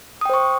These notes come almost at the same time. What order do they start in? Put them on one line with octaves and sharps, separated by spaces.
D#6 G5 C5 C#6